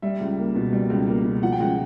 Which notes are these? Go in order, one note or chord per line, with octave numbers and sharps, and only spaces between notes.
G3 E5
C#2
A#3
B2
G3
C#2
A#3
B2
F3 F#5
G5
C#2 F#5